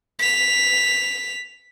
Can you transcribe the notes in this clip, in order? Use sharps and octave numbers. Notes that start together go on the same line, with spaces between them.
B6 F7